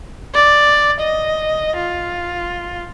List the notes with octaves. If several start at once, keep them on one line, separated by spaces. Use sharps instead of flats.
D5
D#5
F4